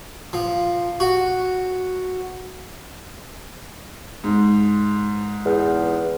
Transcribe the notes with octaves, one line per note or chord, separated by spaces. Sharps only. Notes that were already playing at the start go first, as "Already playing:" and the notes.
F3
F#4
G#2
E2